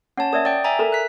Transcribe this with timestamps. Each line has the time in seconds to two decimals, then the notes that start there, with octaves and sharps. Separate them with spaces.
0.17 C#4 C#5 F#5 A5
0.33 A#4 D5 E5 D#6
0.45 D5 G5 D#6
0.64 E5 G#5 A#5
0.79 A4 A#4 A#5
0.92 F#6 B6